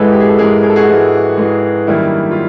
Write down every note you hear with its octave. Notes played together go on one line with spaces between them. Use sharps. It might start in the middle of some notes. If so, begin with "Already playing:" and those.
Already playing: G#2 E3 G#3 A4 B4
G4
G#4
A4
G#2 E3 G#3 G#4 A#4
G#4 A#4
A4
F#4 G#4
G#2 E3 G#3
G#2 E3 G#3
F#2 D#3 G3 A#3 D4 E4
F4